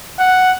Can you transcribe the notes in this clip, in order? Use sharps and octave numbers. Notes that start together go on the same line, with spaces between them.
F#5